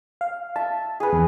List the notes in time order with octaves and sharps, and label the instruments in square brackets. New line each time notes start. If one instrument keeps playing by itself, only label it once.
[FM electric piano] F5
[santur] E5 [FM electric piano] A5
[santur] G#4 B4
[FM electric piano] E2